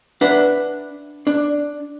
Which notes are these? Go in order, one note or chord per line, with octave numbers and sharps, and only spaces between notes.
D4 B4 E5 F#5
D4